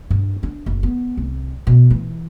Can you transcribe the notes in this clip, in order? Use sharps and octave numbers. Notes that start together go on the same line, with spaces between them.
G2
D4
F#1
B3
C2
B2
E3